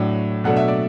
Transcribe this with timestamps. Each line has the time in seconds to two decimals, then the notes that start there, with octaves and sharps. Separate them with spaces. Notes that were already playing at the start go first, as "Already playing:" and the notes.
Already playing: A2 F#3 D4
0.44 B2 F#3 A3 D4 F#5
0.56 E5
0.68 D5